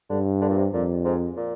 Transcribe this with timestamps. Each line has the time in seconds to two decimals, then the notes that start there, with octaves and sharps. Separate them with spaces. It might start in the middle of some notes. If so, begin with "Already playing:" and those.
0.10 G2 D3
0.41 D3
0.49 A#2
0.58 C3
0.73 F2 A#2
1.05 G#2
1.37 A#2